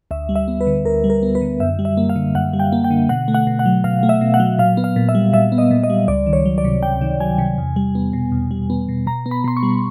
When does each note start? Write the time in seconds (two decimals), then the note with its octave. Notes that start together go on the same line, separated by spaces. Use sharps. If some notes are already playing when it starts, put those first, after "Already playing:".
0.11 D2 E5
0.29 G3
0.36 E5
0.48 B3
0.61 B4
0.67 D3
0.85 D2 A#4
1.04 G3
1.10 A#4
1.23 B3
1.35 B4
1.41 D3
1.60 F#2 E5
1.79 G3
1.85 E5
1.97 A#3
2.09 F5
2.16 D3
2.34 F#2 F#5
2.53 G3
2.60 G5
2.73 A#3
2.84 G5
2.90 D3
3.09 B2 F#5
3.28 A3
3.34 F#5
3.47 B2
3.59 F#5
3.66 F#3
3.84 B2 F5
4.03 A3
4.09 E5
4.21 B2
4.34 F#5
4.40 F#3
4.58 A#2 F5
4.77 B3
4.84 F5
4.96 A#2
5.09 E5
5.15 G3
5.33 A#2 E5
5.52 B3
5.58 D#5
5.71 A#2
5.83 D#5
5.90 G3
6.08 C#2 D5
6.27 D#3
6.33 C#5
6.45 F#3
6.58 D5
6.65 C3
6.83 C#2 G5
7.01 D#3
7.20 F#3 G#5
7.38 C3
7.58 E2
7.76 G3
7.95 B3
8.13 B2
8.32 E2
8.51 G3
8.70 B3
8.89 B2
9.07 B2 A#5
9.26 B3
9.31 B5
9.44 B2 C6
9.57 C#6
9.63 G3